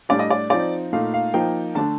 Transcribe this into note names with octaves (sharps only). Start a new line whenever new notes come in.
A2 G3 D4 D5
D#5
D5
F3 C4 D#4 D5
A#2 A3 D#4 F5
F5
F3 A#3 D#4 G5
D3 A3 D4 A5